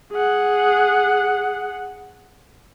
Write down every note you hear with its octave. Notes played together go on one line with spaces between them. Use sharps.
G#4 F#5